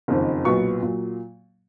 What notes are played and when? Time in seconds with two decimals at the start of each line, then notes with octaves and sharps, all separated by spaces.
0.08 F#1 F2 D#3
0.45 B1 A#2 F#3 B3 C#6
0.82 A#2 F#3